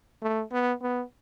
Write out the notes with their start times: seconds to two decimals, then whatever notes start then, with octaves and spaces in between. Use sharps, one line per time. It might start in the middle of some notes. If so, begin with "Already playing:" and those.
0.22 A3
0.52 B3
0.81 B3